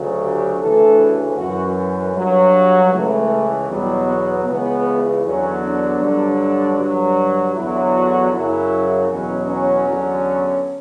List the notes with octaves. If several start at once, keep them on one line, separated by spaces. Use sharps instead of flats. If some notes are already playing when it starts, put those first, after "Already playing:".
Already playing: D2 C#3 F#3
G4
D2 C#3 E3 A4
F#2 E3 F#4
G2 F#3
C#2 C#3 E3 A3
E2 B2 F#3 G3
B3
C#2 C#3 E3 B3
E2 D3 F#3 C#4
D4
G2 D3 F#3
G2 D3 F#3
E2 D3 F#3 E4
F#4
F#2 C#3 F#3 E4
E2 B2 F#3 C#4
C#4
E2 D3 F#3